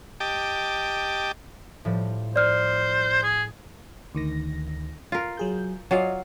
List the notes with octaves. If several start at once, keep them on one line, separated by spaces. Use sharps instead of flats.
G4 D#5 G5 A5 D6
A2 F3 G3
C5 D5 D#6 F6
G#4
D2 D#3 A#6
F4 A#4
F#3 G#4 G6
F#3 F4 D5 D#5 F5 G#5